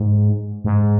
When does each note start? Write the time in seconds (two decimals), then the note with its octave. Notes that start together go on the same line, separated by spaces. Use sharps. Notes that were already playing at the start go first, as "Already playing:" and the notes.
Already playing: G#2
0.65 G#2